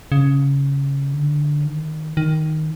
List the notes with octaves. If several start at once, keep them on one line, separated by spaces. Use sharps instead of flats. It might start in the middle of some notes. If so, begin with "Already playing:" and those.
C#3
D3
D#3
D#3